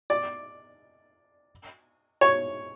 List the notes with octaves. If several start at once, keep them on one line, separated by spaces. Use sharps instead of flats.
D5
C#5